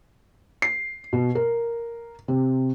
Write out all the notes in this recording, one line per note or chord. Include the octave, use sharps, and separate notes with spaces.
C7
B2
A#4
C3